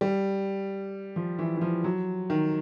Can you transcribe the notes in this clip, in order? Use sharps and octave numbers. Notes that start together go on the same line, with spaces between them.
G3
F3
E3
E3
F3
F#3
D#3